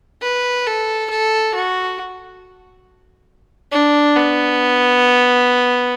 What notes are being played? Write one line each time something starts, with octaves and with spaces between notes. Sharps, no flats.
B4
A4
A4
F#4
D4
B3